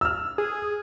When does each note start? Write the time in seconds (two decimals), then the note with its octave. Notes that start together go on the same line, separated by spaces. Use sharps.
0.01 E6 F6
0.38 G#4